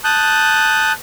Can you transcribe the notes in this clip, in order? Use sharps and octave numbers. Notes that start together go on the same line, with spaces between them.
A5 D#6 F#6 G6